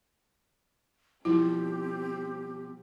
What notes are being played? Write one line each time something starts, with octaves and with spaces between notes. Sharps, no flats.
B2 F3 G3 C4 E4 G4